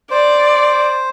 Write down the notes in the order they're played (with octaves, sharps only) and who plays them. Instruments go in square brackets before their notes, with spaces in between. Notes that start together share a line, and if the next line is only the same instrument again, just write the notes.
[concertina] C5 [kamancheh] D5